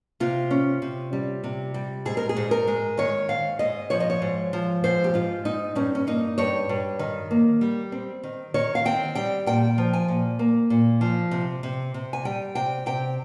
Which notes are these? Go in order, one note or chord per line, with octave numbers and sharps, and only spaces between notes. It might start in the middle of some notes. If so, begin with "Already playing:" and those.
C3 F4
C#4
C3
G3
C3
G3
G#2 G#4
A#4
G#4
G#2
A#4
G#3
D#3 C#5
G#2 F5
G#2 D#5
F3 C#5
D#5
C#5
G#2
F3
G#2 C5
G4
G#2 F4
G#2 D#4
G2 C#4
C#4
A#3 D#4
G2 C#5
G2
D#3
A#3
G3
C4
D#3
D#3 C#5
F5
C4 G5
G3 G5
A#2 G5
F3
G#5
A#2
A#3
A#2
F3
C3
C3
C3
G#5
G3 G5
C3 G5
C3 G5